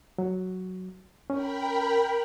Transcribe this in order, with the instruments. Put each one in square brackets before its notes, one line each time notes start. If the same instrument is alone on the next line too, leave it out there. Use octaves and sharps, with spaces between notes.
[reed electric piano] F#3
[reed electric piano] C#4 [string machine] A#4 G5 B5